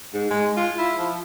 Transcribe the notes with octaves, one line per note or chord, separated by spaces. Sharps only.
G#2
G#3
F4
E4
F3